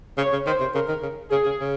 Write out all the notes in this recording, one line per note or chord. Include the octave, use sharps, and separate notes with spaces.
C#3 C#5
C#3
D#3 C5
C3
C#3 A#4
D#3
C#3
C#3 G#4
C#3
C#3